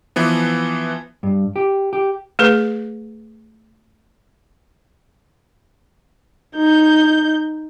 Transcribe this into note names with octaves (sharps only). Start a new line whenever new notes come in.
E3 F3 B3
G2
G4
G4
A3 G#4 B4
D#4 G6